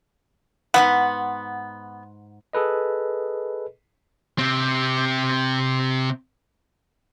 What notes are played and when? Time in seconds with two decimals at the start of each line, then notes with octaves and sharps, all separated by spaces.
0.74 G#2 G3 B3 F#5
2.53 G#4 A4 B4 D#5
4.38 C3 C4